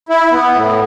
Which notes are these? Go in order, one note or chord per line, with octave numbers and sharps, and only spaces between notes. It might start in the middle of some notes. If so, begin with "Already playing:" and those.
E4
B3
A2